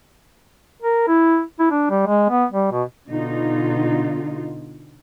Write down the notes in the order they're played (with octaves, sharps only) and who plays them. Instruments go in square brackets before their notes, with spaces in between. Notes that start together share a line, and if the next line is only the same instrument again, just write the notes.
[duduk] A#4
E4
E4
D4
G3
G#3
B3
G3
B2
[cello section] B2 D3 D#4 F4